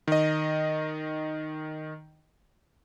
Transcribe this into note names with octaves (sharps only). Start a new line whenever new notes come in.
D#3 D#5